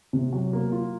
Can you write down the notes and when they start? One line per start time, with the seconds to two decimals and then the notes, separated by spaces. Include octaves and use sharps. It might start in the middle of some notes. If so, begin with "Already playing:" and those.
0.13 C3
0.33 F#3
0.53 A#3
0.72 F4